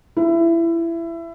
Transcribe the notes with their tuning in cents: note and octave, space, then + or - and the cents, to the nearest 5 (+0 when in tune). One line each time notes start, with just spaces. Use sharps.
E4 +20